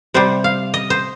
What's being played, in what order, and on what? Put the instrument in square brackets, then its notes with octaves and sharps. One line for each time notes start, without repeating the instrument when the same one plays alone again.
[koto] C3 G3 C5
F5
D#5
C5